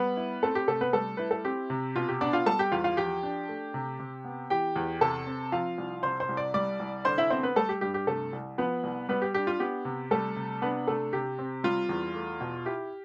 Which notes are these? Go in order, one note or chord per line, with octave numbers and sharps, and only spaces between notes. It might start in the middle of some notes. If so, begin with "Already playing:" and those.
Already playing: G3 B3 B4
E4
A3 C4 A4
G4
C3 A3 A4
B3 B4
G3 A3 A4
E4 B4
A4
C4 G4
C3
B2 F4
G4
B3 D4 D5
F4 F5
G3 A4 A5
G4 G5
E2 F4 F5
F4 F5
F3 G4 G5
D4
A3
C3
C3
B3
E3 G4 G5
E2
C3 A4 A5
C4
F3 F4 F5
C2
C3 C5 C6
C5 C6
C2
D5 D6
G3 D5 D6
C2
D3 C5 C6
E4 E5
B3 C4 C5
B3 B4
G3 A3 A4
G4
G2 G4
G4
C3 A3 A4
C2
F3 B3 B4
C2
G3 B3 B4
G4
D4 G4
F4
B3 G4
C3
G3 A3 A4
C3
B3 D4 B4
C3 A3 A4
C3 G4
C4
G3 F4
E2
A3
B2
E4 G4